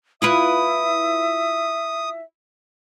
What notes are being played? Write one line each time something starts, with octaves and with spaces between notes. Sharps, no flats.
E4 F4 B4 E5 D#6